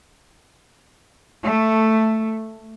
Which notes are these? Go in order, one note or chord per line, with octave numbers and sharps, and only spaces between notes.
A3